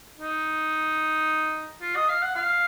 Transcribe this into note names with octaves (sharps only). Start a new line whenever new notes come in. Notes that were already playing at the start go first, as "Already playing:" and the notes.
D#4
F4
D#5
F5
F#5
F5